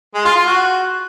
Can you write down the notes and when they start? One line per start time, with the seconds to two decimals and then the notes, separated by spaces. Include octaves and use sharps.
0.14 G#3
0.25 F4
0.35 F4
0.46 F#4